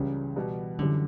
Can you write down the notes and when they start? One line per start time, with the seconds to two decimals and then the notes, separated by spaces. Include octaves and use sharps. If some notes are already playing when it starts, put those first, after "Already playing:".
Already playing: C#2 C#3 E3 G3
0.36 B2 G3 B3
0.79 F#2 D3 E3 G3